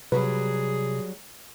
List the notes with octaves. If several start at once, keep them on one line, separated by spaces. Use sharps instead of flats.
C3 F#3 G3 G#4 B4